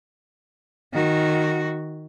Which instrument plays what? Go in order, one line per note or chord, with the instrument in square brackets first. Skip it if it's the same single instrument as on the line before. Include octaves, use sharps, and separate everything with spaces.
[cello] D#3 F#4